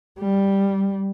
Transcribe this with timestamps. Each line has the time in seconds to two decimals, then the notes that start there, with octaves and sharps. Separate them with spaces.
0.19 G3